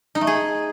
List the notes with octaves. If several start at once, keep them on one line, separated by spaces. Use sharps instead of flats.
D#4
A3
G#4